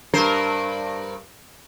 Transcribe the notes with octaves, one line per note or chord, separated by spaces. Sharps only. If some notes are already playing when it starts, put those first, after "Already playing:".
G2 A#4 C5